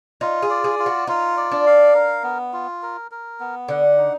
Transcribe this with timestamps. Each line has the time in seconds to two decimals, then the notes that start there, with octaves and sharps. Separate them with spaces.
0.21 D#4 F4
0.42 G#4
0.50 D5
0.64 G#4
0.79 F4
0.86 F#4
1.07 D#4 F4
1.37 D5
1.51 D4
1.66 F5
1.94 A#4
2.23 B3
2.53 F4
2.82 A#4
3.11 A#4
3.40 B3
3.68 D3 F#5
3.98 D#4